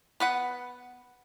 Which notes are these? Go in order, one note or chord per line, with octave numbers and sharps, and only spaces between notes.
B3 B4 F#5